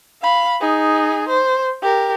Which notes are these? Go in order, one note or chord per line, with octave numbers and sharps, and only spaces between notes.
F5 B5
D#4 G#4
C5
G4 A#4